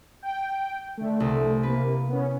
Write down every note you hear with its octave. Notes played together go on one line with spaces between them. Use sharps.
G5
D3 A3
C2
C3 A#3 B4
B3 C#4